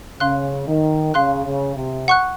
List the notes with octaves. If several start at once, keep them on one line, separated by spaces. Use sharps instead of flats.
C#3 F5 C6 F#6
D#3
C#3 F5 C6 F#6
C#3
C3
F#5 C#6 F#6